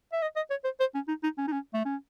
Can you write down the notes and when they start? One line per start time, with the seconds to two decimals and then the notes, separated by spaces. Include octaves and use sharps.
0.13 E5
0.22 D#5
0.36 D#5
0.50 C#5
0.64 C5
0.80 C5
0.94 C#4
1.08 D#4
1.23 D#4
1.38 C#4
1.47 D#4
1.52 C#4
1.74 A3
1.85 C#4